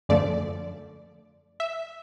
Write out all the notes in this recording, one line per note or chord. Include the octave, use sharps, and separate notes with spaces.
F#2 D3 F3 A3 D5
E5